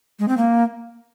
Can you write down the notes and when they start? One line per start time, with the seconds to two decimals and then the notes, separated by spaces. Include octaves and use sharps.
0.19 G#3
0.28 C4
0.37 A#3